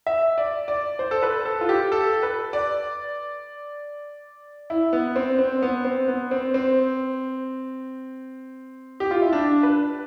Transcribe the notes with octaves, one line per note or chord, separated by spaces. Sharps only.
E5
D5
D5
C5
A4
B4
A4
F4
G4
A4
B4
D5
E4
B3
C4
C4
B3
C4
B3
C4
C4
G4
F4
E4
D4
B4